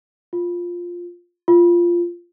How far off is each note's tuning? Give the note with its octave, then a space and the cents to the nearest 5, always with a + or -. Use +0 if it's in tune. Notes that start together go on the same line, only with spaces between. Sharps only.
F4 +5
F4 -10